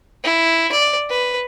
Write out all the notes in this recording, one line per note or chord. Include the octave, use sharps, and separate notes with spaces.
E4
D5
B4